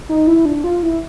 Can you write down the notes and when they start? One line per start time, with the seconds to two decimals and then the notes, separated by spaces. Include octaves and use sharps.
0.09 D#4
0.27 E4
0.45 D4
0.64 F4
0.83 E4